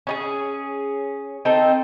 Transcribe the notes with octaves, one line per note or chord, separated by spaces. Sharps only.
C#4 D#4 G#4
C4 D#4 A4